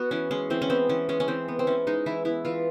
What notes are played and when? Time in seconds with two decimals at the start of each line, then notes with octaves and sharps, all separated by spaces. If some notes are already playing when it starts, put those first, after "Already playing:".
Already playing: B3 F#4
0.11 E3 C#4
0.31 G#3 C#4
0.50 E3 C4
0.62 C#4
0.70 B3 C4
0.89 E3 C#4
1.09 G#3 C#4
1.20 C#4
1.28 E3 C4
1.48 B3
1.59 C4
1.67 E3 C#4
1.87 G#3 D#4
2.06 E3 E4
2.25 B3 E4
2.45 E3 F4